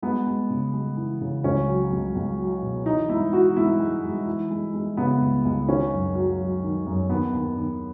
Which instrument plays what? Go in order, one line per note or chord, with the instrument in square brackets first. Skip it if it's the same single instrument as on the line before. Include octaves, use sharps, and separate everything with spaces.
[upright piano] G#3 B3
G#3
C#3
G#3
E3
C#3
C#2 C#4
F#3
C#2
C#2
F#3
B2
E3 D#4
G#2 E4
E3 F#4
G#2 E4
G#3
G#3
E3
G#3
G#3
C#3 B3
C#2
C#2
D#3 C#4
F#2
F#3
F#3
D#3
F#2
D#2 B3
D#2
D#2